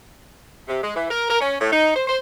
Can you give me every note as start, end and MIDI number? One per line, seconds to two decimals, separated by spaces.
0.68 0.79 48
0.82 0.94 56
0.95 1.09 52
1.10 1.26 70
1.29 1.41 70
1.41 1.55 61
1.59 1.69 45
1.72 1.90 63
1.95 2.05 72
2.07 2.16 72